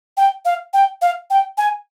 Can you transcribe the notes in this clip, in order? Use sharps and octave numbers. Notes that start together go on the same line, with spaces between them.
G5
F5
G5
F5
G5
G#5